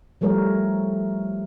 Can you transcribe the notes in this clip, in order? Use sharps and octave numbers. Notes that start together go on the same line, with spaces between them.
F3 G3 A3 A#4 C#5